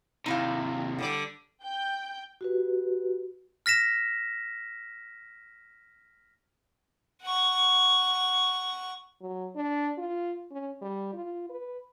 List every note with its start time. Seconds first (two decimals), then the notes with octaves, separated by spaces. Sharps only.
0.26 D#2 C3 D#4 E4 F5
0.99 D3 G3 D5
1.62 G5 G6
2.41 F#4 G4 B4
3.66 F6 A#6 B6 E7
7.23 F#5 C#6
9.21 F#3
9.55 D4
9.98 F4
10.51 C#4
10.81 G3
11.13 F4
11.49 B4